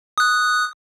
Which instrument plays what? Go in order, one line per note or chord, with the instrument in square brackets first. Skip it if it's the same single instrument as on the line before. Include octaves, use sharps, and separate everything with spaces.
[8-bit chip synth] D#6 F#6